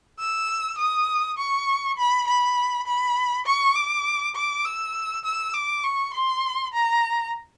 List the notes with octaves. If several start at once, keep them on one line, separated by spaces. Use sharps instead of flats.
E6
D#6
C#6
B5
B5
B5
C#6
D6
D6
E6
E6
D6
C#6
C6
A#5